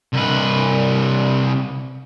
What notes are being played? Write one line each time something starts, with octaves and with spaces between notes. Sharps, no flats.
C2 B4